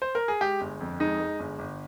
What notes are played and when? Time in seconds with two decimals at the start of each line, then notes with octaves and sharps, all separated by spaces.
0.02 C5
0.15 A#4
0.28 G#4
0.41 G#3 G4
0.61 G1
0.81 F2
1.00 G#3 D#4
1.20 G#3
1.40 G1
1.59 G1